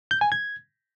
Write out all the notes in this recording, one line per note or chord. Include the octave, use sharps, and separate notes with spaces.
G6
G#5
G#6